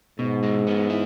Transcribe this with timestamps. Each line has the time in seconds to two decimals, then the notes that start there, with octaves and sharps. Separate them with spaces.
0.19 G#2 B2
0.43 G#3
0.67 B3
0.90 E4